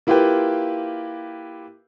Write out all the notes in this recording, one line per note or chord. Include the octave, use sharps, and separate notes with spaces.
A#3 E4 F4 G4 B4 G5